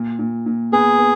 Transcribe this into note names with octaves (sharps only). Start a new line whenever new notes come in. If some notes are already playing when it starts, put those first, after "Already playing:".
Already playing: A#2
A#2
A#2
B3 G#4
B3